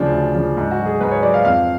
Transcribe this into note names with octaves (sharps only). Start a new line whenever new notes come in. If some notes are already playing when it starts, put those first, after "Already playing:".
Already playing: D2 C#3 F3 D4
D2
C#3 F3
G#2
F#4
F#3
G#4
G#2 B4
C#5
F#3 D5
F5
F2 F5